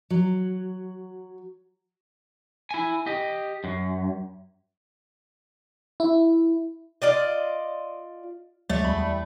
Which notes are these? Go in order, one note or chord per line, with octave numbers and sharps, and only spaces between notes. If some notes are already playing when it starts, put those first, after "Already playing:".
F#3
E4 G#5
G4 D#5
F#2
E4
F4 D5 D#5
D2 F#3 G#3 A3
E2 G3 B5